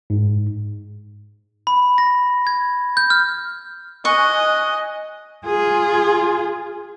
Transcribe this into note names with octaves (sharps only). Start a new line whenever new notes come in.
G#2
B5
A#6
G#6
G6
F6
D#5 G#5 C#6 F#6
F4 G#4